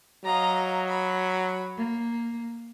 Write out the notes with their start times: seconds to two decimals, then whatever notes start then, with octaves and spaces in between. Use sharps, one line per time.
0.24 F#3 D#5 F5 A#5
0.87 B5
1.77 A#3